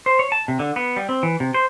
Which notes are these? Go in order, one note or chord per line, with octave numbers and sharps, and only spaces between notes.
C5
C#5
A5
C3
D3
B3
G3
C4
E3
C3
C5